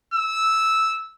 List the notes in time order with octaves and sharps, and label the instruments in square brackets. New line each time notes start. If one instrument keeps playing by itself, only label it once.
[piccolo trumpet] E6